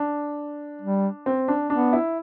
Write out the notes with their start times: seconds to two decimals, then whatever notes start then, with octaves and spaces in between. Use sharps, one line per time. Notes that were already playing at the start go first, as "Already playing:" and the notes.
Already playing: D4
0.82 G3
1.26 C4
1.48 D4
1.70 B3 D4
1.93 E4